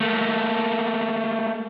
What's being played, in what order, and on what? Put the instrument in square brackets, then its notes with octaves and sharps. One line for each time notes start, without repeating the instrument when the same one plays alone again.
[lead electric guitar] A3 A#3